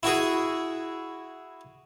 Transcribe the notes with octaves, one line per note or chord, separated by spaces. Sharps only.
E4 F#4 G#4